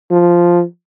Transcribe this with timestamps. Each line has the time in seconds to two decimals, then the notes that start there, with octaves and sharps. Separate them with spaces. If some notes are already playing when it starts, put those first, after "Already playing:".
0.11 F3